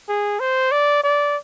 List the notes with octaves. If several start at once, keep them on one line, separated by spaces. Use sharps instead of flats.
G#4
C5
D5
D5